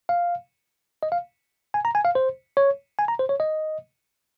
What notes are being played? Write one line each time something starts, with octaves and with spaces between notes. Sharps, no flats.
F5
D#5
F5
G#5
A#5
G#5
F5
C5
C#5
G#5
A#5
C5
C#5
D#5